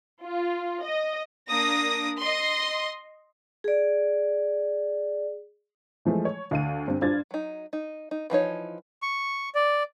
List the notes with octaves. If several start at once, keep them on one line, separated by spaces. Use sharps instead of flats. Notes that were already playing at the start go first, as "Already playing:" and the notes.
F4
D#5
A#3 D4 D#6 A#6
D#5 C6
G#4 D5
E3 F3 G#3 A3
C#5
D2 F5 D#7
G2 C4
G2 D4 F4 C5 G#6 A6
F#3 D#4
D#4
D#4
E3 F3 D#4 C#5
C#6
D5